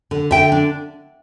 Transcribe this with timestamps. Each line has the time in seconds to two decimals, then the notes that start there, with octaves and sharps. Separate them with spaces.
0.11 D3
0.31 D3 E5 G5
0.52 D4